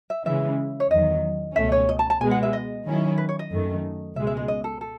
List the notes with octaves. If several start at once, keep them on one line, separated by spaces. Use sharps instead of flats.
E5
C#3 E3 G#3 E5
C#5
E2 D#3 F#3 D#5
C#2 B2 A3 C#4 E5
C#5
D#5
A5
A5
B2 G#3 B3 G#5
F#5
E5
D#5
D#3 F#3 C#4 E4
B4
C#5
D#5
F#2 D#3 A3
C#2 B2 G#3 E5
E5
D#5
D#5
A4
A4